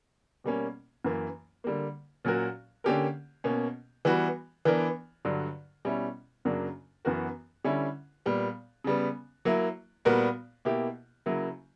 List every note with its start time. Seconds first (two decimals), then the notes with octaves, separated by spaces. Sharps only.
0.44 B2 G3 A#3 C#4
1.04 F#2 E3 A#3
1.64 D3 G3 A#3
2.25 A#2 F#3 C#4 F#4 A#4
2.84 D3 A#3 C#4 G4 A#4
3.44 B2 A#3 C#4
4.05 E3 G3 B3 F#4
4.65 E3 B3 D4 A#4
5.25 G2 D3 F#3
5.85 B2 G3 C#4 E4
6.45 F#2 C#3 F#3 A#3 D4
7.05 F#2 E3 B3 F#4 A#4
7.65 D3 G3 C#4 E4
8.26 A#2 G3 B3
8.84 C#3 G3 B3
9.45 F#3 A#3 E4
10.05 A#2 G3 B3 F#4 A#4
10.65 B2 A#3 E4 G4
11.26 C#3 F#3 A#3 E4